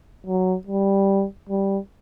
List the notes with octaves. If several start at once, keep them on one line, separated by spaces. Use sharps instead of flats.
F#3
G3
G3